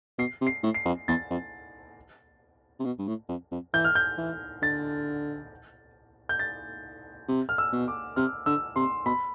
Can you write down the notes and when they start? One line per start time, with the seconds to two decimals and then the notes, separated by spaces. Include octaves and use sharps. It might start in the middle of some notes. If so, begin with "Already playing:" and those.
0.19 B2 C7
0.41 C3
0.47 C7
0.63 A2
0.74 C7
0.85 F2
1.08 E2 A6
1.30 F2
2.80 C3
2.85 B2
2.99 G2
3.07 A2
3.29 F2
3.52 F2
3.74 E3 G6
3.84 F6
3.95 G6
4.18 E3
4.62 D3 A6
6.29 G6
6.39 A6
7.28 C3
7.49 F6
7.58 E6
7.73 B2
7.88 D6
8.16 C3 F6
8.46 D3 E6
8.76 C3 C6
9.06 B2 B5